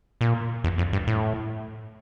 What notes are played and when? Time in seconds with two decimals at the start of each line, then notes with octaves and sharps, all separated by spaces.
0.21 A#2
0.64 E2
0.78 F2
0.93 G2
1.07 A2